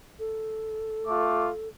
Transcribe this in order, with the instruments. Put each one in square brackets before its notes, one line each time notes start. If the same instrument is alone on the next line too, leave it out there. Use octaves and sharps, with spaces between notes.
[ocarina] A4
[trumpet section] A3 F4 D6